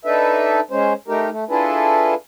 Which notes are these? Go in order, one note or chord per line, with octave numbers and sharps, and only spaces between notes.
D4 D#4 A4 B4 E5
G#3 C#4 C5
A3 D#4 G4 A#4
A3
D4 E4 F4 G#4 A4 B4